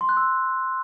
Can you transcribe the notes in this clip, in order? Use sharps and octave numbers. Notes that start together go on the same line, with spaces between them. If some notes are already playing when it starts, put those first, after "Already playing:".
C6
F#6
E6